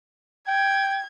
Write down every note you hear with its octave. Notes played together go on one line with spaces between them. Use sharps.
G5 G#6